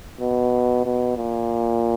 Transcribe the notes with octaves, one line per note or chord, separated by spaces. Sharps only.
B2
B2
A#2